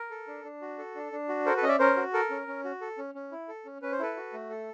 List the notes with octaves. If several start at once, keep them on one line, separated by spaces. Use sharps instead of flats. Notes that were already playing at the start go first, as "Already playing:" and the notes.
Already playing: A#4
A4
D4
D4
F#4
A4
D4
D4
F#4
A4 A#4 C5
A4 B4
C#4 D#5
D5 E5
C#4 A#4 C5
F#4
A4 A#4
C#4
C#4
F#4
A4
C#4
C#4
E4
A4
C#4
C#4 B4
C5
E4 A4 B4
F#4
A3
A4